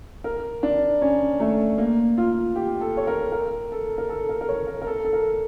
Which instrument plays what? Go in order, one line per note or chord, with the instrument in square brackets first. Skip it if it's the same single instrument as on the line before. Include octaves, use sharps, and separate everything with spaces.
[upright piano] A#4
D4
C#4
A3
A#3
F4
G4
A4
C#5
A#4
A#4
A4
A#4
A4
A#4
A#4
C#5
A#4
A#4
A4
A4
A#4